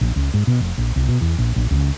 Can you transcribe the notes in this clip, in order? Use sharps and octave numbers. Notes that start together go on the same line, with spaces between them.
A#1
C#2
G#2
B2
F1
A#1
C2
B2
E2
A#1
A#1
C#2